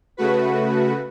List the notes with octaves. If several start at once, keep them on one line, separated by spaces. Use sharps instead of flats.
C#3 A3 F#4 B4